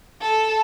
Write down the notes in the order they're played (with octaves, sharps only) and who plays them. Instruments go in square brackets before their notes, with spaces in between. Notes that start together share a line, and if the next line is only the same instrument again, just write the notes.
[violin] A4